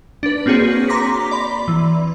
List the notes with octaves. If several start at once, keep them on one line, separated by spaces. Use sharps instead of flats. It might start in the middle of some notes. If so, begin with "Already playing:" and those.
D4 B4
A#3 C4 F#4 G#4 C#5
A#5 C6 D6 A#6 B6
D5 B5 C6
E3